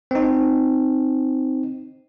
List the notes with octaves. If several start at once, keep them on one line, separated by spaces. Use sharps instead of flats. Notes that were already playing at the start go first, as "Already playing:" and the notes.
C4 D#4